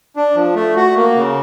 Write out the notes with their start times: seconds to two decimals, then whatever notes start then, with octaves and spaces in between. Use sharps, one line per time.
0.16 D4
0.35 F3
0.55 A3
0.76 F#4
0.96 A#3
1.16 C#3